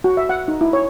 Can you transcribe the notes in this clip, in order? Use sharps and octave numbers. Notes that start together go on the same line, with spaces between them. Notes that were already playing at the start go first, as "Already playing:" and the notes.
F#4
E5
F#5
D#4
E4
C#5